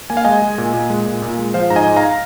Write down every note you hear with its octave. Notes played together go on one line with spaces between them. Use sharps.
A#3 G#5
F5
G#3 D#5 G#5
G#3
A#2
A#2
G#3
A#2
A#2
G#3
F3 C5 F5
G#2 A#5
D#5 G#5
G#2
F5 A#5